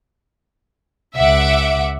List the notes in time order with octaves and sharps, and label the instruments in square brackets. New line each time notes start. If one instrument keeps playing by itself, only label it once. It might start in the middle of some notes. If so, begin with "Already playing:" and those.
[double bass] C#2 [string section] E5 F#5 D6